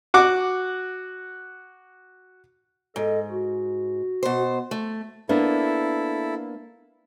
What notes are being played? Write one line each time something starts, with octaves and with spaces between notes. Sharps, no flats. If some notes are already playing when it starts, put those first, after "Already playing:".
F#4 F#5 D6
G#2 A4 D#5
F#4
B2 C5
A3
A#3 B3 D4 E4 A4